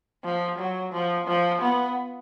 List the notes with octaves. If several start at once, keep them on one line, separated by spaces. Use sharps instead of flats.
F3
F#3
F3
F3
B3